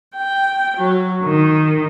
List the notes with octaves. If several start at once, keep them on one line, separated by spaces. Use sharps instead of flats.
G5
F#3
D#3